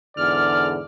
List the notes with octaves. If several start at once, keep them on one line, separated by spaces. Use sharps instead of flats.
E2 G#2 D3 D5 F6